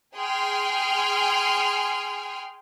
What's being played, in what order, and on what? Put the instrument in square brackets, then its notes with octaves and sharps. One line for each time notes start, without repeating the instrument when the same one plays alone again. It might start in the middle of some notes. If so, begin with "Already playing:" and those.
[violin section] G#4 G5 G#5 C6 F6